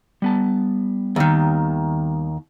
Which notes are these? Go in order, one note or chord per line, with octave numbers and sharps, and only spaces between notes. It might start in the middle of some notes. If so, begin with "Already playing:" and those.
G3 B3 A5
D#2 D#3